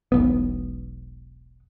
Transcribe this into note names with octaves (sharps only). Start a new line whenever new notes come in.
E1 B1 B3